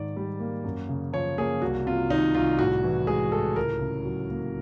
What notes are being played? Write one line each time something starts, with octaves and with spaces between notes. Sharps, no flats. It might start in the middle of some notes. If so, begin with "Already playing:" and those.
Already playing: G#2 D#3 D5
G3
A#3
F#2
C#3
F3 C#5
A#3 G#4
C2 F#4
C3 F4
D#3 D#4
C2 F4
A2 F#4
E3
G#3 G#4
A2 A4
C#2 A#4
C#3
F#3
A#3